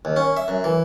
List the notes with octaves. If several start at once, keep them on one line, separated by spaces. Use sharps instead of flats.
D#2
C#4
E5
F#2
E3